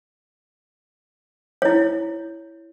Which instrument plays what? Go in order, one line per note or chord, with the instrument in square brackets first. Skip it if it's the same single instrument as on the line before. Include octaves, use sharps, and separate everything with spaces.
[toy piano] E4 C#5